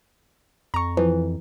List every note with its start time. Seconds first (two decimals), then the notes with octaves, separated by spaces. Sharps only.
0.74 F2 A#5 C#6
0.97 E3 F3